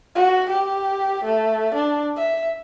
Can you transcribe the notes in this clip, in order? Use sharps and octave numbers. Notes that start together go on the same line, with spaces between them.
F#4
G4
A3
D4
E5